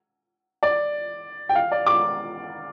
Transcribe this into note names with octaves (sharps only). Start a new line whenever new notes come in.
D5
G5
F5
D5
D6